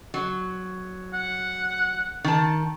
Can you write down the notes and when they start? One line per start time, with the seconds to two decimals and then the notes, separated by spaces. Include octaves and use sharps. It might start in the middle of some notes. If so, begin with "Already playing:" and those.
0.14 F#3
1.14 F#5
2.24 D#3 A5